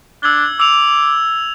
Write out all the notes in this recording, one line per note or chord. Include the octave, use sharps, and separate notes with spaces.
D4 E6 G#6 G7
D6 E6 F7